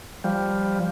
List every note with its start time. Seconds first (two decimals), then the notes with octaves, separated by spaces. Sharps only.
0.24 F3 G3